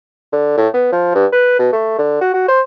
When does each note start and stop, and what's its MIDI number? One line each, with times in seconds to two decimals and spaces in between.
0.32 0.56 50
0.57 0.68 45
0.74 0.89 59
0.92 1.10 53
1.15 1.26 43
1.32 1.55 71
1.59 1.68 47
1.73 1.94 57
1.98 2.18 50
2.21 2.33 66
2.34 2.47 66
2.48 2.61 72